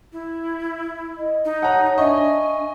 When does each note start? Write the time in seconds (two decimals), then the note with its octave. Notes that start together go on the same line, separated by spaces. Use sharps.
0.12 E4
1.18 D#5
1.45 D#4
1.62 C#5 F#5 A5 A#5
1.98 D4 D#5 E5 G#5 C#6